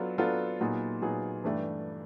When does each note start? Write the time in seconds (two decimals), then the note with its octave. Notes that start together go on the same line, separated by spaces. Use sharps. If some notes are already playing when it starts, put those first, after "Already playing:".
Already playing: F#3 B3 D4 F4 A4
0.18 F#3 B3 D4 F4 A4
0.61 A#2 F#3 B3 D#4 G#4
1.02 A#2 F#3 B3 D#4 G#4
1.44 G2 E3 A3 D4 G4